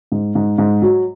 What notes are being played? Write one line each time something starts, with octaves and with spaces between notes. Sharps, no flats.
G#2
G#2
G#2
F#3